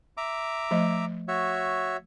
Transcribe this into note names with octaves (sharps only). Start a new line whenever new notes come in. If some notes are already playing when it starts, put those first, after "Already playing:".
E5 A#5 D6
F3 A3 D#5
F#4 C#5 E5